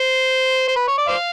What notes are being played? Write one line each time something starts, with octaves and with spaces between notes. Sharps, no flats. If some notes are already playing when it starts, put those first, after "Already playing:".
Already playing: C5
C5
B4
C#5
D5
C5 D5 F5